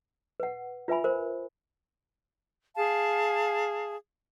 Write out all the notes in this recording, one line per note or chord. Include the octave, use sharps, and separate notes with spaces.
B4 F#5
F4 B4 E5 G#5 B5
A#4 C5
G#4 F5 A5